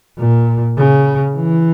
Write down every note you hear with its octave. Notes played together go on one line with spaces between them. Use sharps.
A#2
C#3
E3